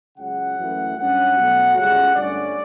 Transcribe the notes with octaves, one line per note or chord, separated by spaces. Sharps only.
C#2 C#3 F#3 F#5
F#2 E3 A3
G2 F#3 C#4 F#5
B2 F#3 A3
C#2 C#3 G3 F#5
G2 D3 A3 C#4 D5